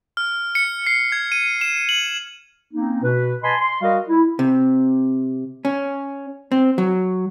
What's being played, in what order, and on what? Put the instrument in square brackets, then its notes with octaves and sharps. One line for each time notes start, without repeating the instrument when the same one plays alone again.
[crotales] F6
C#7
C7
G#6
D#7
E7
F#7
[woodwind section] A#3 C4 C#4 D#4
B2 B4
B4 D#5 G#5 A5 B5 C6
C6
G3 F#4 A#4 D#5 F5
E4
[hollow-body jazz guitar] C3
C#4
C4
F#3